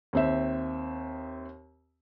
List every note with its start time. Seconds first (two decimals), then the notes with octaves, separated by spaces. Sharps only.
0.13 D#2 C4 E5